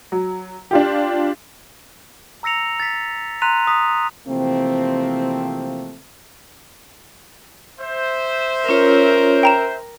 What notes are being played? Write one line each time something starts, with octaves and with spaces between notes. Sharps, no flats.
F#3
D4 F4 G4
A#5 E6 A#6 C#7 F7
A6 B6
A#5 C6 F#6 B6 D#7 F7
D#6 B6
C3 E3 F3 A3 A#3 C4
C5 E5
C#4 F4 A#4 C#5
G5 A#5 E7